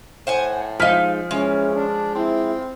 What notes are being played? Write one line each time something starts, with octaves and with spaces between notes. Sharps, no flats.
A2 C5 F#5 G#5
F3 G#3 D#4 F5 F6 B6
E3 G#3 C#4
D4
C4 E4